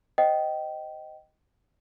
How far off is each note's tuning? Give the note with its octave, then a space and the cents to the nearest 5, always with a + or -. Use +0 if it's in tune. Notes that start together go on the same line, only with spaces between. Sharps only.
C5 +0 D#5 +0 G5 -20